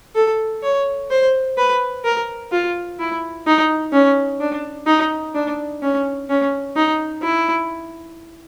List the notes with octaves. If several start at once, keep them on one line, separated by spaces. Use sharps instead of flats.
A4
C#5
C5
B4
A#4
F4
E4
D#4
C#4
D4
D#4
D4
C#4
C#4
D#4
E4